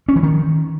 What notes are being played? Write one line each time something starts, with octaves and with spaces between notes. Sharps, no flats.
C#4
E3
D#3